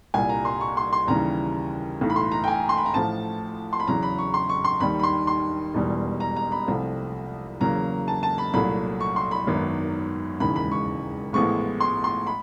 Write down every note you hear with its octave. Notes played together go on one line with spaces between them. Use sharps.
C2 A#2 G3 G#5
A#5
C6
C#6
C6
C6
D#2 C#3 E3 G3 A#5
B1 A2 E3
B5
C6
A#5
G5
G#5
C6
B5
A#5
A1 A2 F3 A5
C6
B5
E2 C#3 F#3 A#5
B5
C#6
C6
C#6
C6
D#2 D#3 G3 B5
B5
C6
C6
E1 E2 B2 G3
A#5
A#5
B5
C2 C3 F3 A3
E2 C#3 F#3 A#3 A#5
A5
A5
B5
C2 A#2 F#3 A3 B5
C#6
C6
B5
G#1 F#2 D#3 F#3 B3
E1 D#2 C#3 E3 G#3 B5
B5
C#6
A1 A2 F3 G#3 B3 C#6
C6
C6
B5